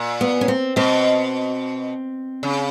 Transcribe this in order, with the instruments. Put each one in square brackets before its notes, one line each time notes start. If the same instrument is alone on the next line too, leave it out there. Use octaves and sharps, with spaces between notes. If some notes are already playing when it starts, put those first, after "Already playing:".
Already playing: [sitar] A#2
[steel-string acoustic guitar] B3
C#4
C4
[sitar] B2 [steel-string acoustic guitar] C4
[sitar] C#3